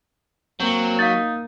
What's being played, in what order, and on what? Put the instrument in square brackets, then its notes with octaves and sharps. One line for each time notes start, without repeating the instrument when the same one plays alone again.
[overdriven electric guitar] F#3 [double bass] A#3 [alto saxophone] C4
[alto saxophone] D#4 [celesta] F5 A6